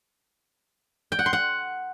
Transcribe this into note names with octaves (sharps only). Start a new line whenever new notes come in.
G5
F#5
C6
F#5